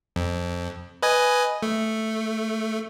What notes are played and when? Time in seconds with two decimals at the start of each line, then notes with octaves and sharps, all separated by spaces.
0.16 F2
1.02 B4 D#5 G#5
1.63 A3